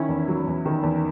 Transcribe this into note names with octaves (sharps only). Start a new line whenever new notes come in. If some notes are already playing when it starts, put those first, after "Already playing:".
Already playing: D#3 C#4 E4
E2
F#3
E2
D#3
E2